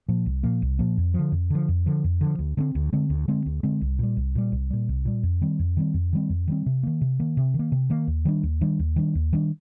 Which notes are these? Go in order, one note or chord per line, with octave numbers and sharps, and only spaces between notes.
A#2 F3 A#3
C2
A#2 F3 A#3
C2
A#2 F3 A#3
F2
D3 F3
F2
D3 F3
F2
D3 F3
F2
D3 F3
D2
D3 G#3 C4
D2
D3 G#3 C4
D2
D3 G#3 C4
D2
D3 G#3 C4
C2
A#2 G3
C2
A#2 G3
C2
A#2 G3
C2
A#2 G3
F2
D#3 G3 C4
F2
D#3 G3 C4
F2
D#3 G3 C4
F2
D#3 G3 C4
C3
D#3 A#3
C3
D#3 A#3
C3
D#3
A#3
C3
D#3 A#3
D#2
D#3 G3 D4
D#2
D#3 G3 D4
D#2
D#3 G3 D4
D#2
D#3 G3 D4